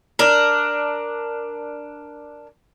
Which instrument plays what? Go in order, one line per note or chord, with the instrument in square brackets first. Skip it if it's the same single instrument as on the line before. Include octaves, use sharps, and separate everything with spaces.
[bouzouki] D4 A#4